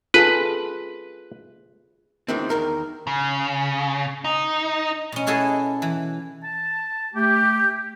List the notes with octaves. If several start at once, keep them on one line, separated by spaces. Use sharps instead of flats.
F4 G#4 A4 B4
D2 D#3 E3 G#3 C4
E2 D#3 A#4
C#3
D#4
B2 C#4
E4 F#4 G#4 A4 D#5 E5
E3
A5
A3 G4